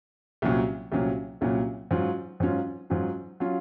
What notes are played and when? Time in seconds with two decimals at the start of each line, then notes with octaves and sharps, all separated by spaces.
0.42 C2 A#2 F#3 C#4
0.92 C2 A#2 F#3 C#4
1.41 C2 A#2 F#3 C#4
1.91 G#2 F#3 C#4 F4
2.40 G#2 F#3 C#4 F4
2.90 G#2 F#3 C#4 F4
3.40 F#3 C#4 F4